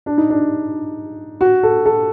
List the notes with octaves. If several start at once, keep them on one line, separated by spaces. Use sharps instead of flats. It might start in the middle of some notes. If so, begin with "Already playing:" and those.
D4
D#4
D4
F#4
A4
A4